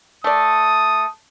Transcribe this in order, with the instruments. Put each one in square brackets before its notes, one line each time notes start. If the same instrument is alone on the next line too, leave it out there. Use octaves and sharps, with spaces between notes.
[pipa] A3 D5 [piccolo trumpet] D#6